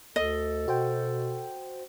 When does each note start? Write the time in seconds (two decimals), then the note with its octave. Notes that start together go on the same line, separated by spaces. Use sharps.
0.16 D2 A4 D#5
0.68 B2 F#4 C5 G5